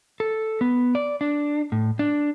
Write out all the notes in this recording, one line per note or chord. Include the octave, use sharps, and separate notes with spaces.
A4
B3
D5
D4
A2
D4